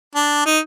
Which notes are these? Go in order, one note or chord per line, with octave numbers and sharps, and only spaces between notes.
D4
D#4